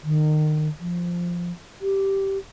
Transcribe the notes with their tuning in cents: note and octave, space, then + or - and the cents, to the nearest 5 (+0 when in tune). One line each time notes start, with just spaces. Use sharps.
D#3 -30
F3 +0
G4 -10